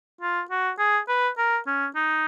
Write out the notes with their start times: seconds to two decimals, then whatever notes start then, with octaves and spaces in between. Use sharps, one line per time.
0.21 F4
0.50 F#4
0.78 G#4
1.08 B4
1.38 A#4
1.67 C#4
1.95 D#4